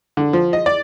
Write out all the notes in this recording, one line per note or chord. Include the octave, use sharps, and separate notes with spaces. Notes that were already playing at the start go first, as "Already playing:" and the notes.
D3
F3
D#5
D5